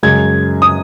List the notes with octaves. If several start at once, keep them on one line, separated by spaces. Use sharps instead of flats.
F#2 C#3 G#3 G#6
D#6